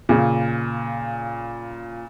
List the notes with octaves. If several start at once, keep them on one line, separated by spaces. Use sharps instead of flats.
A#2 C#3